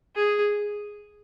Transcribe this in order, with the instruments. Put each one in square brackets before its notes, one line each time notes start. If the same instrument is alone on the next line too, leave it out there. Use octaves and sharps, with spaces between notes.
[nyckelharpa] G#4